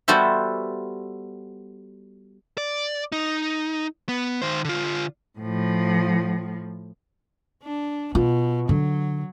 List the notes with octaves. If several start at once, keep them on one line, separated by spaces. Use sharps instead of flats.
G3 B3 F#4 A4 C5 E5
D5
D#4
B3
D#3 C5
D3 F4
A2 F3
D4
B2 F4
D3 F#3